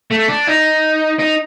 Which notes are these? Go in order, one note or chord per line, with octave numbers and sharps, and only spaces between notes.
A3
D4
D#4
D#4